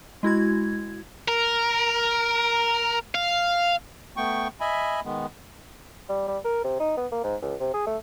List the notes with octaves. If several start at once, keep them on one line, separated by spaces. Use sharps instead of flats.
G#3 E4 F#4 G#6
A#4
F5
A3 B3 G5 C#6
D#5 E5 G#5 B5
D#3 G#3 B3
G3
G3
A#4
C3
D#4
B3
A#3
G#2
C#2
C3
G#4
A3